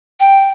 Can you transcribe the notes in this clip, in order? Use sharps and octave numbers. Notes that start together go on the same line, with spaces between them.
G5